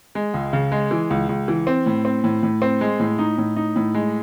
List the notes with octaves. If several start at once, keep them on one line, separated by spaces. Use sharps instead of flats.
G#3
C#2
C#3
G#3
E3
C#2
C#2
E3
C4
A2
C4
A2
A2
C4
G#3
A2
D#4
A2
D#4
A2
G#3